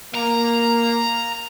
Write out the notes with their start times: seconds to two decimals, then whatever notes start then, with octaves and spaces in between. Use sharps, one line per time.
0.15 A#3 A#5